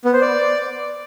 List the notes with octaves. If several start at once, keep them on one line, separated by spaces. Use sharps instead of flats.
B3
C5
D5